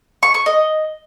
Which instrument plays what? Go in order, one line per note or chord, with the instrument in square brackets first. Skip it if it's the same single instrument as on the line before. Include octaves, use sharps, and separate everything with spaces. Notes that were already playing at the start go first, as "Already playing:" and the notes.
[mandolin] C#6
C#6
D#5